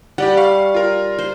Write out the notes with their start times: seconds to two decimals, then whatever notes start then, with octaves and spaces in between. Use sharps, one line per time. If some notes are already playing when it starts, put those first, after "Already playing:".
0.18 G3 G4 D5 F#5
0.37 F5 C#6
0.74 F4 A#4
1.18 C5